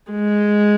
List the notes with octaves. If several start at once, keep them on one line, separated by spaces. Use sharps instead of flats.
G#3